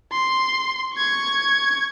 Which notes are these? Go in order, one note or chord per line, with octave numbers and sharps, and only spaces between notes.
C6
C#6 G#6